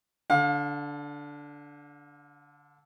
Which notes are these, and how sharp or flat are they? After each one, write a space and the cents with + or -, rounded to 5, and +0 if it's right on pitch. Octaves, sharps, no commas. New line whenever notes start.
D3 -10 F5 +35